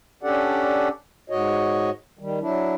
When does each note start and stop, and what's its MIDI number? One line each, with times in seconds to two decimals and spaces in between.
0.23 0.89 61
0.23 0.89 62
0.23 0.89 67
0.23 0.89 69
0.23 0.89 74
0.23 0.89 78
1.30 1.90 44
1.30 1.90 66
1.30 1.90 73
1.30 1.90 75
2.19 2.39 51
2.19 2.39 55
2.40 2.75 54
2.40 2.75 62
2.40 2.75 64